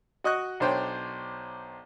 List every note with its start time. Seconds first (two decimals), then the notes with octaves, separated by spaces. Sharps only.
0.24 F#4 D#5 C#6 F#6
0.60 B1 D4 C5 C#5 G5